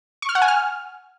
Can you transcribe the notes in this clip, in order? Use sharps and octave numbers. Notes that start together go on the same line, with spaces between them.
C#6
F6
F#5
G#5
F6